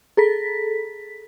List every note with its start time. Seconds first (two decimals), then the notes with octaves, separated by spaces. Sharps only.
0.17 G#4 A4 B6